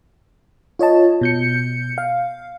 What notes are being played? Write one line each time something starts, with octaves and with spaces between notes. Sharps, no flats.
F4 C#5 D#5 A5
B2 G6 C#7
F5